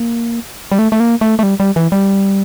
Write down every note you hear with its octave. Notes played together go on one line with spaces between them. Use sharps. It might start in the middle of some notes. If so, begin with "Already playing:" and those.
Already playing: A#3
G3
A3
A3
A#3
A3
A3
G3
G3
E3
G3